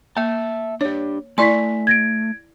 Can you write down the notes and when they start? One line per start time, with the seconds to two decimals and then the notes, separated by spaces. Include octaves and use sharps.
0.17 A#3 E5 A5
0.81 D4 G4 C#5
1.38 A3 E4 D5 G#5 C6 B6
1.87 G#6 A#6 D7